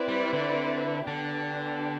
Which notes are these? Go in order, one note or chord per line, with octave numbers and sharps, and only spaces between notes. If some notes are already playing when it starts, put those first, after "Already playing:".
Already playing: C4 E4 B4 D5
G3
D3
D3 B3 D4 G4